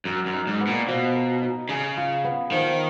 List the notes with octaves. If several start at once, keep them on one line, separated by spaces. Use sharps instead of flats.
F#2 A#4
F#2
D#4
G#2
B3
A#2
B2 F3
A#4
D#4
C#3 G#4
F4
B3
D#3 F3